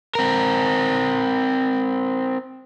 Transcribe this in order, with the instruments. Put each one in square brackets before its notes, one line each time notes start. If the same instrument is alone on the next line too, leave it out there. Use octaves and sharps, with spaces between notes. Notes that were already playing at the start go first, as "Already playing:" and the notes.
[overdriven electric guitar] C4 A#4